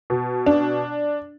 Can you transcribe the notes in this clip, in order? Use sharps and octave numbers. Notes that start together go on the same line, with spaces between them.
B2
D4